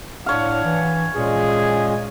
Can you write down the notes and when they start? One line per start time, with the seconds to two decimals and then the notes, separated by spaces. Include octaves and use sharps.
0.26 A2 D4 C#5 F5 F#5
0.65 E3
1.16 A#2 G#3 C#4 F4 G#4